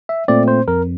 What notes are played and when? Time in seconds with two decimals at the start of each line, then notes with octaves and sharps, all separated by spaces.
0.09 E5
0.28 A#2 A3 C4 D5
0.48 C5
0.68 F2 A#4